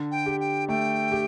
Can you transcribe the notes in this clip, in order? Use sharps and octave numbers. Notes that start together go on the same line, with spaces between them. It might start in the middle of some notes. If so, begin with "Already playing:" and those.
Already playing: D3
G5
G4
G5
A3 G5
G4